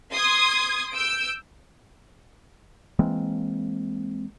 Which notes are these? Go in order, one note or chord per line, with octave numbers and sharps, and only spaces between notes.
C6 D#6 G#6
E6 G6 D7
E3 G#3 A#3 C4